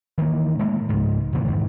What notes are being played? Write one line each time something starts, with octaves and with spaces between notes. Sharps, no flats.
D#3 E3 A#3
A2 G#3 A#3
C#2 G#2
E2 A#2 C#3 E3
E2 G#2 D#3